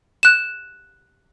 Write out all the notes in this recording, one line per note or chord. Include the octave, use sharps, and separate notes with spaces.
F#6 E7